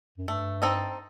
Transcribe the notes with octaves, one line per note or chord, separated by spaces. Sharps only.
F#2
G2 A3
C4 D#4 A4 D#5